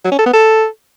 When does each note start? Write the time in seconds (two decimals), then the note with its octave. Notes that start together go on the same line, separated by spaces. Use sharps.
0.04 F#3
0.11 C#4
0.19 A4
0.26 B3
0.33 A4